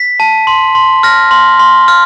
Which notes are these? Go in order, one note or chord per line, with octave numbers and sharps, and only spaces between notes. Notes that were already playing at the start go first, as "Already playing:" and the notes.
Already playing: B6
A5
C6
C6
F6 A#6
C6
C6
F6